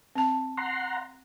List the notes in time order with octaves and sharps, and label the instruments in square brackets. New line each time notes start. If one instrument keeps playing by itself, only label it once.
[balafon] C4 A5
[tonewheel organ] F#5 A#5 C6